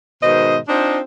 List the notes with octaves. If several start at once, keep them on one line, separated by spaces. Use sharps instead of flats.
G#2 B2 D#3 C5 D#5
C4 D4 D#4 F4 C5